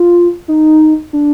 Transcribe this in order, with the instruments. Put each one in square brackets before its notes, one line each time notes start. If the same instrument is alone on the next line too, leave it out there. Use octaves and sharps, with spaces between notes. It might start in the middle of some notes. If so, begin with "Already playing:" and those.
Already playing: [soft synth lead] F4
D#4
D4